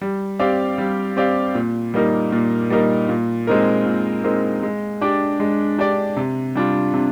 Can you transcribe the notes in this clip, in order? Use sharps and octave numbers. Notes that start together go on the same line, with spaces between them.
G3
C4 G4 D5 F5
G3
C4 G4 D5 F5
A#2
G3 A#3 D#4 A#4
A#2
G3 A#3 D#4 A#4
A#2
G#3 C4 D#4 A#4
A#2
G#3 C4 D#4 A#4
G#3
D4 G4 D5
G#3
D4 G4 D5
C3
G3 D4 F4
C3